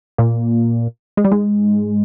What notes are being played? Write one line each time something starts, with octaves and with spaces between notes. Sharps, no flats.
A#2 A#3
G#3
G3
G#2 G#3